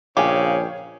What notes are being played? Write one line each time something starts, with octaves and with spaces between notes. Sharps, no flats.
A#1 C#3 G4 C#5 F5 G#5